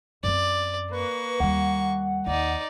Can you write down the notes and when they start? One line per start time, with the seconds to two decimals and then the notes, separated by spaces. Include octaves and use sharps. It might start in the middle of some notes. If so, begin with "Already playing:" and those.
0.24 F#2 C4 D5
0.91 A#3 B4 C#6
1.40 D#2 G3 F#5
2.27 D#2 D#4 D5